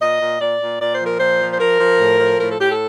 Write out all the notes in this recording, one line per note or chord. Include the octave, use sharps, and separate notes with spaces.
A#2 D#5
A#2
A#2 D5
A#2
A#2 D5
C5
F3
A#4
A#2 C5
F3
C5
F3 A#4
F3
A2
F3
A2 A#4
A4
A2 G4
A4